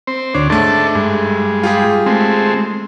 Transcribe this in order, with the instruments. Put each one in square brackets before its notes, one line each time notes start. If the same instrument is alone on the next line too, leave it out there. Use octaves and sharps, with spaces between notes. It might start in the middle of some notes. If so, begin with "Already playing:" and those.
[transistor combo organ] C4 C5
[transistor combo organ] D2 D4 [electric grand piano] C#5
[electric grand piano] G#2 A3 [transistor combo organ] D4 A4
[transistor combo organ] G2 G#3
[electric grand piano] F4 G4 G#4
[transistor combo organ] G#3 A3 C4